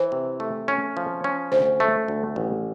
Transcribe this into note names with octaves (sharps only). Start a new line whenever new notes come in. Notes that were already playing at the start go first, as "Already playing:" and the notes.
Already playing: E3 C5
C3
A3
C#4
F3
C#4
D2 C5
A3
D2
A1